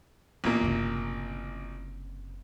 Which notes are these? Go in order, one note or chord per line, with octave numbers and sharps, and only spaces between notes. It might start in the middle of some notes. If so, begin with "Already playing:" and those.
A1 A#2 A#3 B3
F#1 C3